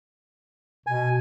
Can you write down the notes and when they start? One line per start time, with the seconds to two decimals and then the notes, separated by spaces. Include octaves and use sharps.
0.87 B2 G#5